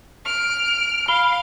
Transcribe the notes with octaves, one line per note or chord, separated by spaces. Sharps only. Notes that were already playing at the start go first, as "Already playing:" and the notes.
F6 D7
F5 B5 F6 G7